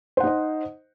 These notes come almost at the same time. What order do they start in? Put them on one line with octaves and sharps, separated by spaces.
C5 F#5 D#4 D#5